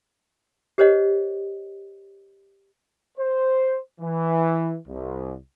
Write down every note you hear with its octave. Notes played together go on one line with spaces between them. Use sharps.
G4 A#4 C5 C#5 D#5 F#5
C5
E3
C2